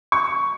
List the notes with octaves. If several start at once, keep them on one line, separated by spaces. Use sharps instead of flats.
C#6